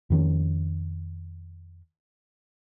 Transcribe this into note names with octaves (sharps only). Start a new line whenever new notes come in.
F2 D#3 C#4